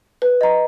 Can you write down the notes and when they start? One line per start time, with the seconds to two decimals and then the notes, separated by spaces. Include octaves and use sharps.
0.22 B4
0.41 D#5 A#5